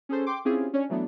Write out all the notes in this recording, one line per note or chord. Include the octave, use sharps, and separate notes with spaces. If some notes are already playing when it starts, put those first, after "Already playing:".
C#4 G#4 A4 C5
G5 C6 D6
C4 C#4 E4 F4 G4 G#4
C#4 D4 C#5
E3 F#3 A3 B3 D4